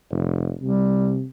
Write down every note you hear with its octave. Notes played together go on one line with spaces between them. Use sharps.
F1
C3 G3